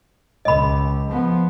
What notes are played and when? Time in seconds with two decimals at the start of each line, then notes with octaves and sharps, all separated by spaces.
0.45 C#2 D#5 B5
1.10 F3 B3